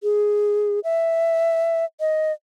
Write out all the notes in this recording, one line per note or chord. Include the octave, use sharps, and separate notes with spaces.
G#4
E5
D#5